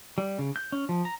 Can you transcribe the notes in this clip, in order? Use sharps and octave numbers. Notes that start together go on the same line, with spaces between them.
G3
C#3
G6
C#4
F3
A#5